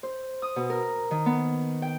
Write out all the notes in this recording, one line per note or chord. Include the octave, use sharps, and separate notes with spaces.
C5
D#6
B2
A#4
D#3
B3
G5